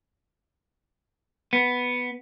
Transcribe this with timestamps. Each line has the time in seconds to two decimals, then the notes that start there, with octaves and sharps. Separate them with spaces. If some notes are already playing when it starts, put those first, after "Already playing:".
1.53 B3